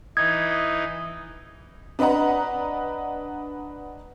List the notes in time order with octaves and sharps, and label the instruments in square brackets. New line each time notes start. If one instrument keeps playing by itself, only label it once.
[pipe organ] E3 D#4 [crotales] D#6 [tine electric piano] G#6
[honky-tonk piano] D4 B4 D#5 F#5 A#5